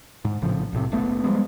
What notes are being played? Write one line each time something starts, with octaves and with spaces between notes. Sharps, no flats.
G#2
A#1 A2 C#3 F3
B1 A2 C3
F#1 A3 B3
F3 G3 G#3 B3